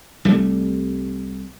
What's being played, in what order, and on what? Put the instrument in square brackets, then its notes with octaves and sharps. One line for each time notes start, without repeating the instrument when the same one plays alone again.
[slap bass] C2 G3 A3